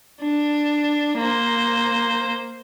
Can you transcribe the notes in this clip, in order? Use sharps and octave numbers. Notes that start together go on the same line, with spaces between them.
D4
A#3 C5